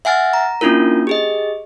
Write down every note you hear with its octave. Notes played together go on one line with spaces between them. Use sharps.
E5 F#5 G#5 F6 A6
A#5
A#3 C#4 D4 E4 F4 A#4
G4 G#4 D#5